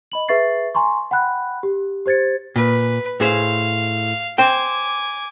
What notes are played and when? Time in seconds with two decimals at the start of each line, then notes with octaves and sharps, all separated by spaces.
0.12 D#5 B5 F#7
0.28 G#4 B4 E5 C#6 A6 C7
0.75 G#5 A#5 C6 C#6
1.11 F#5 G5 B5 F#6
1.63 G4
2.06 G4 C5 G#6 A6 C#7
2.56 A#2 B4
3.20 A2 G#4 C5 F5
4.38 C5 G5 G#5 D6